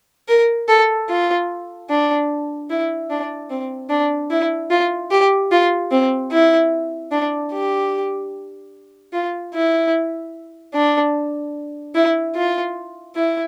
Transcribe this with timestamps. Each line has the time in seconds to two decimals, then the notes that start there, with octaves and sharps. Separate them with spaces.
0.28 A#4
0.68 A4
1.09 F4
1.89 D4
2.70 E4
3.10 D4
3.50 C4
3.90 D4
4.31 E4
4.70 F4
5.11 G4
5.51 F4
5.92 C4
6.31 E4
7.12 D4
7.52 G4
9.13 F4
9.54 E4
10.74 D4
11.95 E4
12.35 F4
13.15 E4